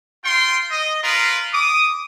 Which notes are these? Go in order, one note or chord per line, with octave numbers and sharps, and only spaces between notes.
F4 G5 C6
D#5
F4 A#4 B4
D6 D#6